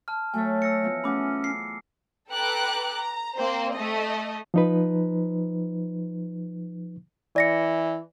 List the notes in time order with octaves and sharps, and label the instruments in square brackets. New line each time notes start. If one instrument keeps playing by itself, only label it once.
[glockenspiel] A5 F6
[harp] F#3 C#5 [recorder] A3 [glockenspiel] G#5
[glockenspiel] E6 A#6 C#7
[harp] E3 F3 B3
[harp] A3 G#4 F#5 [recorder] C#4 [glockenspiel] B5 D6
[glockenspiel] C7
[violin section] A4 B4 G5 A#5 D6 F#6
A#5
A#3 C4 C5
A3 D#5
[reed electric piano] F3 D#4 B4
[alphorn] E3 [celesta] D5 A#6 C#7